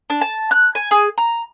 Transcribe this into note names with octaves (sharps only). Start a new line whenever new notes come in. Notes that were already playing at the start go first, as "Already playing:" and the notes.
D4
A5
F#6
G#5
G#4
A#5